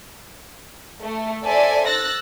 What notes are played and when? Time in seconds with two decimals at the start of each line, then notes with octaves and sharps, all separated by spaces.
1.01 A3
1.44 A4 C5 D5 E5 G#5 A5
1.87 E6 F#6 A6 A#6